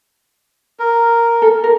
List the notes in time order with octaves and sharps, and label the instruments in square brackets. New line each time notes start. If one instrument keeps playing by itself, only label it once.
[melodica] A#4
[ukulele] A4
A#4